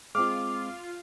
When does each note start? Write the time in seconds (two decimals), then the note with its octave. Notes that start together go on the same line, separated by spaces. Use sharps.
0.15 G#3 C4 F4 F5 D6 F6